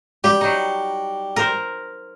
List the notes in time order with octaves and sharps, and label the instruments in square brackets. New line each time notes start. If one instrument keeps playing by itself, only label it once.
[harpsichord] G3 [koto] G4
[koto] F#3 D#4
A#4 C5